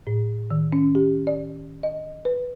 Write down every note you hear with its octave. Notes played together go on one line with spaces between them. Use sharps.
A2
D#3
C#4
G4
D5
D#5
B4